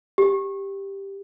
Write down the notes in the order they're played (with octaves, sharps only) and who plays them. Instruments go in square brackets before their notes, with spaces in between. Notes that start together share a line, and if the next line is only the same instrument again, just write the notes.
[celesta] G4